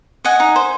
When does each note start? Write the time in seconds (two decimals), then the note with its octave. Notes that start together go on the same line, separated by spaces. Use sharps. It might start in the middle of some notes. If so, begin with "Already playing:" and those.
0.25 D#5 F#5 G#5
0.40 D#4
0.56 C5